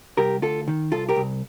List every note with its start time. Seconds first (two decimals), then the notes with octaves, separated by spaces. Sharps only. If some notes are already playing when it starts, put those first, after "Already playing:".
0.17 C2 G4 A#4
0.42 D2 F4 A4
0.68 D#3
0.92 C2 F4 A4
1.09 G4 A#4
1.16 C2